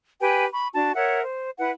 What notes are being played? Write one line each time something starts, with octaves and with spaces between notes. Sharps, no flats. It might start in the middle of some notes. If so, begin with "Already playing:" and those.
G4 B4 G5 G#5
B5 C#6
D4 F#4 A5
A#4 C#5 E5 F#5
C5
E4 B4 F#5